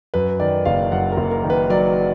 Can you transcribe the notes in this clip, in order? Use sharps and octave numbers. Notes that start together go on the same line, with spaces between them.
F#2 B4
D#3 D5
F#1 F5
F#2 F#5
A#4
F#1
A#4
D#3
B4
F#3 D5